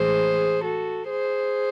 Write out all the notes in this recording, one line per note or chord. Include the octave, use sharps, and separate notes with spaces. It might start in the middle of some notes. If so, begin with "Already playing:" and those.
Already playing: A2 E3 G#3 G#4 C5
F#4 A4
G#4 C5